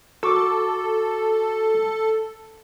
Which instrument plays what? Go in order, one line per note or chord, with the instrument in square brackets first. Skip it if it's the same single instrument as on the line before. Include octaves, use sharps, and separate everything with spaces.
[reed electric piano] F#4 C#6 D6 [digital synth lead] A4